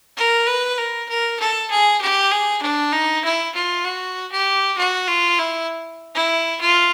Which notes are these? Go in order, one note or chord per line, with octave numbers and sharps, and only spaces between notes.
A#4
B4
A#4
A#4
A4
G#4
G4
G#4
D4
D#4
E4
F4
F#4
G4
F#4
F4
E4
E4
F4